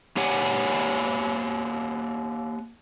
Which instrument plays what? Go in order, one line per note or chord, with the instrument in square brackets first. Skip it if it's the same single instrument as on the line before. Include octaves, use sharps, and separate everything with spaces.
[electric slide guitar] A#3 G4 C#5 F#5 G#5